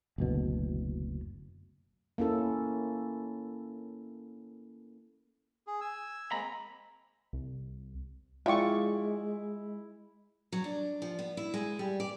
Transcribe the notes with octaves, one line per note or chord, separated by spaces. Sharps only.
F#1 D2 B2
A#3 C#4 E4 A4
G#4
G#5 E6
G#3 A#3 C4 A#5 B5
C2
G#3 E4 F4 D5 E5 G5 C#6
F#3
D4
F3
B3
E4
G#3
G3
D5